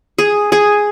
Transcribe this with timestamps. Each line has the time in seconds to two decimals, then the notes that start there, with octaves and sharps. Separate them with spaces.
0.18 G#4
0.52 G#4